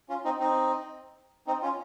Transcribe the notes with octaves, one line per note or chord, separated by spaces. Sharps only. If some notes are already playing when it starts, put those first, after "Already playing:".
C#4 F4
C4 D#4
C4 D#4
C4 D#4
C#4 F4